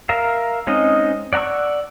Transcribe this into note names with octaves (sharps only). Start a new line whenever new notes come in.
A#4 E5 F5
G#3 C4 C#4 D#4 D#5
D5 F#5 A#5 C#6 E6